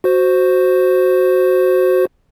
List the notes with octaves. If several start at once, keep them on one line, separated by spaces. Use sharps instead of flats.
F#4 C5